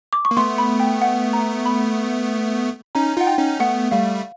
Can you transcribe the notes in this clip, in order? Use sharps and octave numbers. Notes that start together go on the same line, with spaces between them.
D6
C#6
A#3
A3 B3 C6
B5
G5
F#5
A#5
B5
C#4 D#4 A#5
D#4 F4 F#5
G5
C#4 D#4
A3 B3 F#5
G3 A3 F5